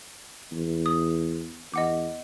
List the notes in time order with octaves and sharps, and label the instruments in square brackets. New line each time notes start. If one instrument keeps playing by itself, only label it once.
[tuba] E2
[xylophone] D#6
[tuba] E2 [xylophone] D#5 F#5 D6